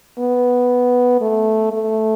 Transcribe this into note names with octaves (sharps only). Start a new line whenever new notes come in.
B3
A3
A3